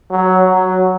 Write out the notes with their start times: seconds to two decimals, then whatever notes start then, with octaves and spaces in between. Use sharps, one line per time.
0.10 F#3
0.50 F#3